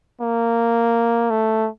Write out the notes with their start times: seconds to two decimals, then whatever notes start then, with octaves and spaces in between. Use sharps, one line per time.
0.21 A#3
1.30 A3